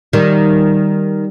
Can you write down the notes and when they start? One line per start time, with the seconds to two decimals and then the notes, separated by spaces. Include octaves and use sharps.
0.13 D#3 G3